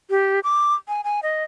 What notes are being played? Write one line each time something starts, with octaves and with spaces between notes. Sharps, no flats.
G4
D6
G#5
G#5
D#5